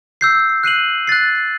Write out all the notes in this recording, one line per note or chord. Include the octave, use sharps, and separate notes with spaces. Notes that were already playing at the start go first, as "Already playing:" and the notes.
E6 G6 C7
F#6 C7 D#7 F#7
F#6 A6 C7